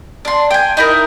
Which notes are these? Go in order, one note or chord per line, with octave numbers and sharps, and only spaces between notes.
D4 C6
G5 G#5
D#4 E4 A#4